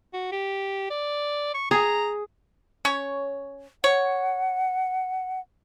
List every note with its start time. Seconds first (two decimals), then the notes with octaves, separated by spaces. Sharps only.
0.13 F#4
0.32 G4
0.90 D5
1.54 C#6
1.71 G#4 A#5
2.85 C#4 C#5
3.84 C#5 F#5